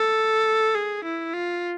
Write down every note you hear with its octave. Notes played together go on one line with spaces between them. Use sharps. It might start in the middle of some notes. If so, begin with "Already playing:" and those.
Already playing: A4
G#4
E4
F4